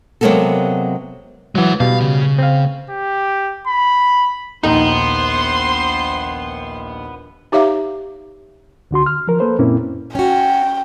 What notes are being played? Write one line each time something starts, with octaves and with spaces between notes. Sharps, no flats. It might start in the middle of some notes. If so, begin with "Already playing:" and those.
C3 F#3 G#3 A#3 B3 A4
E3 F#3 G#3 F#5
B2 G3 B3 F5
C#3
C4 F5
G4
B5
A#1 D#2 B3 D#4 C5 C6
D#4 G4 C#5 E5 F5 A#5
C#2 D3 F#4 C6
F6
F3 A#4
A#3 A4 B4 C5
F#2 A#2 A#3 C4 C#4 E4
C#4 F#4 G5